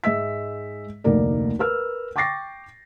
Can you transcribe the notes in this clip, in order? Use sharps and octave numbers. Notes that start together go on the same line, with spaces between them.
G#2 G#3 D#5 E5 E6 B6
F1 D2 A#3 D#4 A#4 D5
A#4 B4 E6 F6
G5 C#6 D6 A6 A#6 C7